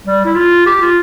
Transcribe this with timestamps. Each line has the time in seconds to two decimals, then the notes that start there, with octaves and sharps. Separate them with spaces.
0.06 G3
0.25 E4
0.35 F4
0.66 G4
0.81 F4